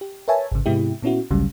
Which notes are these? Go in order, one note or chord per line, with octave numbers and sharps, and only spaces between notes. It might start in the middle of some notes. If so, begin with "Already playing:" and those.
G4
A#4 B4 C#5 E5 G#5 A5
G#1 C#3
G#2 C3 G#3 B3 E4 G4
A#2 B3 C#4 E4 F#4
A1 D2 A2 C#3 F#3 G3